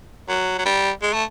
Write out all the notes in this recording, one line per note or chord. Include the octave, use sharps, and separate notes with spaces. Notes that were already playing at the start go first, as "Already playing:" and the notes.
F#3
F#3
G3
G#3
A3